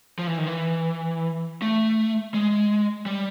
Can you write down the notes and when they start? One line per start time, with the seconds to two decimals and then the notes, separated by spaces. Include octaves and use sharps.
0.19 F3
0.27 E3
0.38 D#3
0.47 E3
1.62 A3
2.34 G#3
3.06 G3